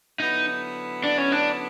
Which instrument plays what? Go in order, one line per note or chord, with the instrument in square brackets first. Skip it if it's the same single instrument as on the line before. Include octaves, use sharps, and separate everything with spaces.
[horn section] D3 F#3 B3 E4 [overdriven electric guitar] D#4
[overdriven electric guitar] D4
C#4
D4